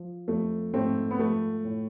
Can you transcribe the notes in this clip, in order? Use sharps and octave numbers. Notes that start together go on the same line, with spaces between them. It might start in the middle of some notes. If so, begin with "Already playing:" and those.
Already playing: F3
F2 A3
G#2 A3 C4
B3
F3 A3
A2